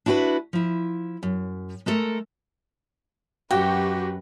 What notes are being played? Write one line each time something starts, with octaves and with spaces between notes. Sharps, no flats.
D4 E4 F#4 G4 B4
F3 E4
F#2
G#3 A3 A4 A#4
F#2 F#4 G4 B4 G5